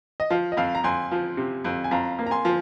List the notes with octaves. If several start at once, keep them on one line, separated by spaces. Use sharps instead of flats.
D#5
F3 F5
D#5
F2 F5
A#5
F2 G#5 C6
F3
C3
F2
G#5
F2 F5 A#5
A#3
A#5
G#5 C6
F3